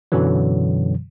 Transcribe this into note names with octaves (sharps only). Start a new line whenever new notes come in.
F#2 B2 D3 E3 F#3